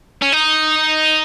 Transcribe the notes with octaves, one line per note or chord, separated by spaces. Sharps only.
C#4
D#4